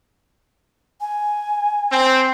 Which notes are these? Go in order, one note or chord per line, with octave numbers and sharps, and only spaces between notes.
G#5
C4